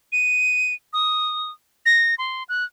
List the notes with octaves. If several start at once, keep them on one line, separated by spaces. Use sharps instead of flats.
D#7
D#6
A#6
C6
F#6